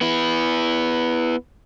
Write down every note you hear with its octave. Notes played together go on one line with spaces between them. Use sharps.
B3 E4